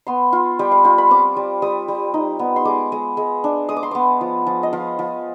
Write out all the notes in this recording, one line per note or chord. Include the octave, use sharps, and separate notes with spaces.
B3 C6
F4
G3 G5
F5
F4 G5
B5
C4 D6
G3
G3 D#6
G3
D#4
B3
C6
G#3 D6
G#3
G#3
D4
G#3 D#6
D6
C6
B3 D6
F3
F3
D#5
F3 F5
F3